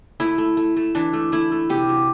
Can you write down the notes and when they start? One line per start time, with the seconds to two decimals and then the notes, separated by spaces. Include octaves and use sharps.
0.20 A3 E4
0.38 A3
0.57 A3
0.77 A3
0.95 E3 D4
1.13 A3
1.32 A3 E4
1.52 A3
1.69 C3 G4
1.89 F#3